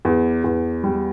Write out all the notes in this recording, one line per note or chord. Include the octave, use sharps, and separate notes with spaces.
E2
E2
G3